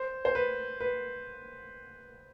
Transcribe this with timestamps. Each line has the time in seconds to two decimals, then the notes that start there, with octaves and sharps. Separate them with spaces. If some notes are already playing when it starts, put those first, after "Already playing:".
Already playing: C5
0.25 C5
0.35 B4
0.81 B4